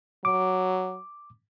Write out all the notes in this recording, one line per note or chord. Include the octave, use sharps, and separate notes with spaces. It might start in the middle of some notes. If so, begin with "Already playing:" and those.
F#3 D6